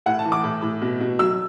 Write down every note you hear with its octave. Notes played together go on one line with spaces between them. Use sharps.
A2 F#5
A5
E3
D6
A2
A2
B2
B2
F#3 E6